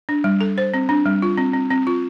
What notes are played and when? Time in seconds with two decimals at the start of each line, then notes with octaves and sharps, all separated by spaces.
0.09 D4
0.24 G3
0.41 A4
0.58 C5
0.74 C4
0.89 D4
1.06 G3
1.22 F4
1.37 C4
1.54 C4
1.70 C4
1.87 F4